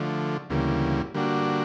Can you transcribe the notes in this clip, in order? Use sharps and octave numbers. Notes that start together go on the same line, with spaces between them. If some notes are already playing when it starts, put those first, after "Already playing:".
Already playing: D3 F3 A3
D2 C#3 E3 G3 A#3
D3 G3 A#3 D4 F#4